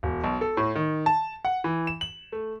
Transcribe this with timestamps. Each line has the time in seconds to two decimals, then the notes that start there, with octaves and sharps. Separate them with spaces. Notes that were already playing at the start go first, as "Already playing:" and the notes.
0.03 E1
0.24 B1
0.41 A4
0.57 A2
0.75 D#3
1.06 A5
1.45 F#5
1.64 E3
1.87 E7
2.01 F#7
2.32 A3